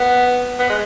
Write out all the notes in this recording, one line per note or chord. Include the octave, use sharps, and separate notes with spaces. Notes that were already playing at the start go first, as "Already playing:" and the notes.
Already playing: B3
B3
G#3